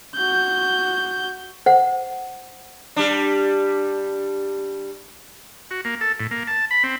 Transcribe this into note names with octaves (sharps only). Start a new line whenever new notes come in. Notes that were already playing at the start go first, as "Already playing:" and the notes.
F#4 G6
C5 F#5
G3 D4
F#4
A#3
A4
A2
A#3
A5
B5
C4